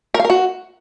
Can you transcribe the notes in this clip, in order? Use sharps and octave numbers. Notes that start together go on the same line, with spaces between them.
A#4
F5
A#4
F#4